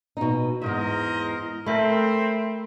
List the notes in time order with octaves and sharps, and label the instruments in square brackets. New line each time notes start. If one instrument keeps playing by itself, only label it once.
[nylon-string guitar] B2 D#4
[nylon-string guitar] E2 G#2 B3 [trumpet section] A#4 C5 D#5
[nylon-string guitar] A3 [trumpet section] C4 [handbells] A#4 E5 B5